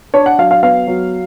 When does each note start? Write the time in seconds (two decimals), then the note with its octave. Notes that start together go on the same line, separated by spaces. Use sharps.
0.14 D4 C#5
0.26 F#5
0.38 F#3 F5
0.51 F5
0.63 B3 F5
0.87 F#3